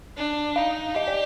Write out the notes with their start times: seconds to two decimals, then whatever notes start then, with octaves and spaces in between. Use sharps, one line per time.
0.17 D4
0.56 D#4 F5
0.95 G4 D#5
1.08 D5